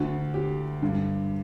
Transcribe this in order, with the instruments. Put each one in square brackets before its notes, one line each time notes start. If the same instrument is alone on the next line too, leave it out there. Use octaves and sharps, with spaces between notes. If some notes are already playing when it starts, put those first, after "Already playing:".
Already playing: [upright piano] D2 D3 F#4
G4
G2 D3